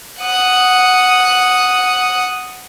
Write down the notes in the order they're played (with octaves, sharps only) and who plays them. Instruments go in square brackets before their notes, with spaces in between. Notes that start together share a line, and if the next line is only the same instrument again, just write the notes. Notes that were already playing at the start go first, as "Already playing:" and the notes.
[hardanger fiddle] F#5 D#6